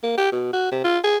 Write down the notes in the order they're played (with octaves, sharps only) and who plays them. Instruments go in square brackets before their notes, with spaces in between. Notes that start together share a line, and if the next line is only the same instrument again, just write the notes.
[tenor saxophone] A#3
G4
B2
F#4
C3
F4
G#4